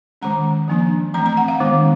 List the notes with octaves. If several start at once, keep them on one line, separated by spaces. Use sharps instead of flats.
D#3 G#3 C#4 A#5
F3 A#3 D4
E3 A3 C4 A#5
A#5
F#5
F5
D#3 G#3 B3 D4